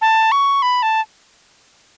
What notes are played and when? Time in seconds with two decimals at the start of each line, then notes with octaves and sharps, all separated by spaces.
0.01 A5
0.32 C#6
0.62 B5
0.83 A5